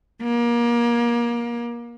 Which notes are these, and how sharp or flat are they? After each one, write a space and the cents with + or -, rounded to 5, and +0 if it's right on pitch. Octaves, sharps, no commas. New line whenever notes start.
A#3 +30